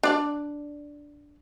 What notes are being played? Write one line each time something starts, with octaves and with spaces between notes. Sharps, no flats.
D4 D5